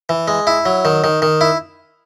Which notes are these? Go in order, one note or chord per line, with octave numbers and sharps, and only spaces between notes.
E3
G#3
E4
F#3
D#3
D#3
D#3
E4